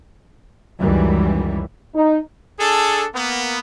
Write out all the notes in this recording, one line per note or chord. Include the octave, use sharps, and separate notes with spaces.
C#2 F#2 D#3 E3 F#3 G3
D#4
D4 G#4 A4
A#3 B3